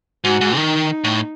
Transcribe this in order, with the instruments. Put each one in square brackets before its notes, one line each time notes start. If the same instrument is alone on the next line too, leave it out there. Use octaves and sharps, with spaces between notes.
[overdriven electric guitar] G#2 [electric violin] F#4
[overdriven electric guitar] G#2
[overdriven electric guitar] D#3 [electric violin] D#4
[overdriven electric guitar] A2